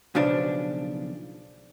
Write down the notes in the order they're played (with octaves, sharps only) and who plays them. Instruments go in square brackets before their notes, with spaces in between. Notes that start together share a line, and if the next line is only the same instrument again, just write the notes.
[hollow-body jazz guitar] B1 C#3 F3 D4